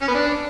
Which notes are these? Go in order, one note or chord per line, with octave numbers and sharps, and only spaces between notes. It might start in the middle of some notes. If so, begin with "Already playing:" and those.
C#4
B3
D4